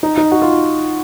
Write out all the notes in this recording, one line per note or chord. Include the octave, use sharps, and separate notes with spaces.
D#4
D#4
F#4
F4